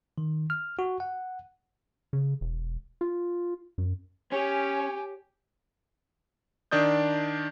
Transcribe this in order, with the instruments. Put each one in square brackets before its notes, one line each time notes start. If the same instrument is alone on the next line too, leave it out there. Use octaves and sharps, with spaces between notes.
[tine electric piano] D#3
F6
F#4
F#5
[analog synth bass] C#3
E1
F4
F#2
[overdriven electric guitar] C#4 [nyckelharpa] G4 [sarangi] C#5 [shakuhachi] G#5
[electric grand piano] D#3 D4 D5 D#6 G6